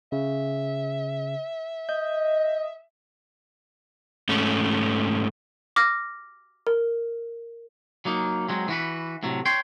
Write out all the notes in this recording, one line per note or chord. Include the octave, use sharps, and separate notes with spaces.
C#3 E5
D#5 G6
G#2 A3 C#4
D6 F6 A#6
A#4
F#3 A#3 D#4
F#3 G#3 C4
E3 F#4 B4
A2 C3 F#3
C#5 G5 C6